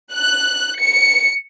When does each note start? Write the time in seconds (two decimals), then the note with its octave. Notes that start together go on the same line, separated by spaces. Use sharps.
0.14 F#6
0.80 C#7